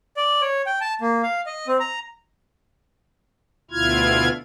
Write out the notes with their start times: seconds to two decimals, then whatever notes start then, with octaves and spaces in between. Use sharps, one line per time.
0.17 D5
0.42 C#5
0.66 G5
0.81 A5
1.01 A#3
1.23 F5
1.46 D#5
1.67 C4
1.80 A#5
3.71 D2 B2 E4 F4 F6 G#6